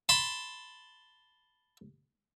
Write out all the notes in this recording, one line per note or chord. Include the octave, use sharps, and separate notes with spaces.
A5 B5 C6